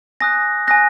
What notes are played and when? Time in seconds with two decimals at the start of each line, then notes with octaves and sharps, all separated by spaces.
0.21 G#5 D#6 F#6 A#6
0.67 G#5 D#6 F#6 A#6